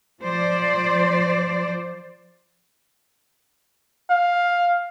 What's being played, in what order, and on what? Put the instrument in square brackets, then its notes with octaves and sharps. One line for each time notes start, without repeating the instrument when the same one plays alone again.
[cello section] F3 C5 D5
[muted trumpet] F5